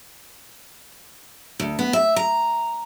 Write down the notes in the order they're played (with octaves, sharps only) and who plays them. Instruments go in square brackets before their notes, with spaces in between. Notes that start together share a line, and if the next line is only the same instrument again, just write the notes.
[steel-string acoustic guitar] D2
B3
E5
A#5